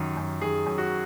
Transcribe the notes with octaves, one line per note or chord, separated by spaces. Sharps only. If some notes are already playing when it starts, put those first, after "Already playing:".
Already playing: F#2 D#3
F#2
D#3 G#4
F#2
F#4